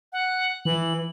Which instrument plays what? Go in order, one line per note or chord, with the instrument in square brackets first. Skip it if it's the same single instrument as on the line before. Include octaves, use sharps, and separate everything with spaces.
[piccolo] F#5
[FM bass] E3 [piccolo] F#7